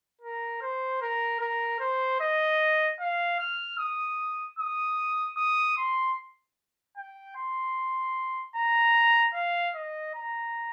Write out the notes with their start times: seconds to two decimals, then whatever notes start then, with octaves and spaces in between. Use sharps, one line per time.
0.21 A#4
0.61 C5
1.02 A#4
1.40 A#4
1.80 C5
2.20 D#5
3.00 F5
3.39 F6
3.79 D#6
4.59 D#6
5.37 D#6
5.77 C6
6.97 G5
7.36 C6
8.56 A#5
9.34 F5
9.75 D#5
10.15 A#5